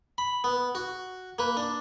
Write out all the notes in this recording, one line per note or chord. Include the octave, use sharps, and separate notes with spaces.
B5
B3
F#4
A#3 B4
D4